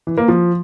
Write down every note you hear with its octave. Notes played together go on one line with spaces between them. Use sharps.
E3
A#3
F3